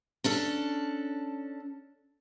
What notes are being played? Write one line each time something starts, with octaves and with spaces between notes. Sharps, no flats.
C#4 D4 A4